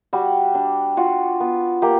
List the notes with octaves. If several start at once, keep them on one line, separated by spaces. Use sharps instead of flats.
G3 F#4
D4
F4 F#4
B3
A#3 G4